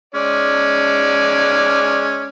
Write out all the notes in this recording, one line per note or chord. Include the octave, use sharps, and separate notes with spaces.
G#3 C#4 D5